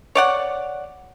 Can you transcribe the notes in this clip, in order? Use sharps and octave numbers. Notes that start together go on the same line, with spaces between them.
C#5 D5 F#5